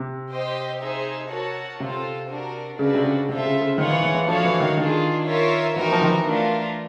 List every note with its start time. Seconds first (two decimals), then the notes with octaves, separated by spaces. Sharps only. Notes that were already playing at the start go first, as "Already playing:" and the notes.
Already playing: C3
0.31 G4 C5 D#5 G5
0.81 D#4 G#4 C5 E5
1.30 F#4 A#4 C#5 F#5 A5
1.80 C3 F4 A4 C5
2.29 D4 F#4 A#4
2.79 C#3 D4 F#4 B4 D5
2.94 C3
3.04 C#3
3.28 C3 F4 A4 C5 E5
3.46 C#3
3.61 C#3
3.78 D#3 F4 G#4 C#5 F#5
3.90 E3
4.02 E3
4.15 E3
4.27 F3 D4 F#4 A4 C#5 F5
4.45 E3
4.60 D#3
4.77 D#3 D4 F4 G#4
5.26 F4 A#4 C#5 E5
5.76 E3 C4 D#4 F#4 A#4
5.92 F3
6.02 D#3
6.08 E3
6.25 A3 D4 F4 A#4